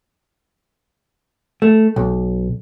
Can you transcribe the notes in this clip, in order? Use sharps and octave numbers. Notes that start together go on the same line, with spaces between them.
A3
B1